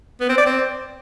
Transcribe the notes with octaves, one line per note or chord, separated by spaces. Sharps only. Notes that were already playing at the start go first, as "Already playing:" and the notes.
B3
C4
D5
C4